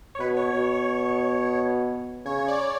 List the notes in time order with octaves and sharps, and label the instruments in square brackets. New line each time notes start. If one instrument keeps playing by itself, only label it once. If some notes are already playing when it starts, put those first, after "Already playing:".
[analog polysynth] C#5
[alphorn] B2 [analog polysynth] B4
[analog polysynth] C#5
[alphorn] B2 [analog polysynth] C#5
[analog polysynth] C#5
[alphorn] C#3 [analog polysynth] C#5
[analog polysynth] C#5
D5